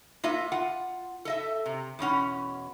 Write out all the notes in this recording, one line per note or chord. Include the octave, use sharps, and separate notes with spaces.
A#3 F4 D#5 E5
F4 F#5
A4 D#5 E5
C3
E2 B2 C#4 F#5